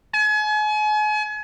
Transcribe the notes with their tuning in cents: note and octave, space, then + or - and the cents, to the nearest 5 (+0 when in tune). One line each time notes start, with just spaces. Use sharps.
G#5 +40